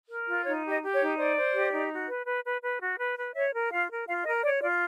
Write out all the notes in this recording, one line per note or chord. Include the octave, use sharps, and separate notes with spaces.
A#4
F4
D#4 C#5
G4
D#5
G4
C#5
D#4
C5 D5
C5
G4
D#4
F#4
B4
B4
B4
B4
F#4
B4
B4
C#5 E5
A#4
F4 F5
A#4
F4 F5
A#4 D#5
C#5 D5
F4 D5